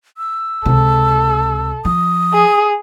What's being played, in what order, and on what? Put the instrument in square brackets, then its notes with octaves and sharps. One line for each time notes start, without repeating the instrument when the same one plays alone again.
[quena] E6
[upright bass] C#2 C3 [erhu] A4
[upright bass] F3 [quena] D#6
[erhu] G#4